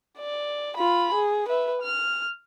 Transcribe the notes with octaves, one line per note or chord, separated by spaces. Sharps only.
D5
F4 B5
G#4
B4 E5
F6